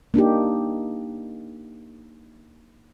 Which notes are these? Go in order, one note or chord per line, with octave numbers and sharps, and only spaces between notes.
A#3 D4 D#4 G4